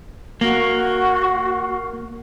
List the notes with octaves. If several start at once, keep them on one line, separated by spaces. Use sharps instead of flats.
A#3 F#4